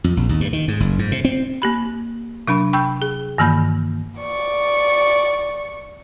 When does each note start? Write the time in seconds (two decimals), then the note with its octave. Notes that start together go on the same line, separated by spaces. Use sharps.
0.04 F2
0.17 A#1
0.29 D#2
0.41 G2
0.53 D#3
0.68 G#2
0.80 F#1
0.99 G#2
1.12 C3
1.25 C4
1.62 A#3 G4 B5
2.48 C3 F#3 D4 B5
2.73 G5 B5 C#6 E6 G6
3.02 G#4
3.38 G2 D#3 E3 A#3 B5 G6
4.20 D5 C#6